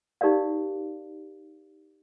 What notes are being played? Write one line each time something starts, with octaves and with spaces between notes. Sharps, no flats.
D#4 G4 A#4 D5 F5